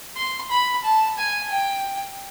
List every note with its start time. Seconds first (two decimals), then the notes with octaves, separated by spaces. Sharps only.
0.17 C6
0.51 B5
0.84 A5
1.18 G#5
1.51 G5